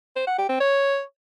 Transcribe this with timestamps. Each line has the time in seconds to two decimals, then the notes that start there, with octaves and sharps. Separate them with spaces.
0.16 C5
0.27 F#5
0.38 G4
0.49 C4
0.60 C#5